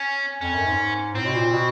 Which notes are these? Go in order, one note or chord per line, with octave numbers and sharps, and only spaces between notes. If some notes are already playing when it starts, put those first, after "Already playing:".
Already playing: C#4
F2 C#4
F#2
G#2
A2 C4
B2
A#2
B2